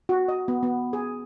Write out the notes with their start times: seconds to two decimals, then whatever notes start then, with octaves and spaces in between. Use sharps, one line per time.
0.09 F#4
0.28 D#5
0.48 B3
0.63 B3
0.93 G#4